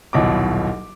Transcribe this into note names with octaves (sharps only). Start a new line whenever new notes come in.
D#1 B1 B2 E4 D6